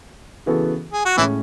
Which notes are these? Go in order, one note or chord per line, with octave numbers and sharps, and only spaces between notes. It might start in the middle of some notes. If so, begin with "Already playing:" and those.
C#3 E3 B3 F#4 A4
G#4
F#4
A2 E3 G#3 C#4 E4